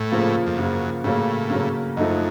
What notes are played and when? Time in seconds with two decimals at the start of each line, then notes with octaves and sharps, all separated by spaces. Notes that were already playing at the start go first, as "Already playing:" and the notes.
Already playing: A2
0.12 C#3 F3 A#3
0.46 F2
0.58 F#2 C#3 F3 A#3
1.04 A2 C#3 F#3 A#3 C#4
1.50 C#3 F#3 A#3 C#4
1.97 F#2 F3 A3 D#4 A4 D#5